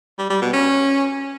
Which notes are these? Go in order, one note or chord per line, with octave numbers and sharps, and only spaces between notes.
G3
G3
B2
C#4